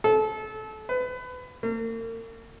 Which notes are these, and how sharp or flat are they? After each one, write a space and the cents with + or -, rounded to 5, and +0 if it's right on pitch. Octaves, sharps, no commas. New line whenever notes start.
A4 -25
B4 +25
A#3 -45